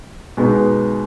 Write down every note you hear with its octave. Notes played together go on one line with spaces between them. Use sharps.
B2 G#3 B3 D#4